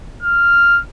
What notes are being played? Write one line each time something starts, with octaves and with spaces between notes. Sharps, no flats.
F6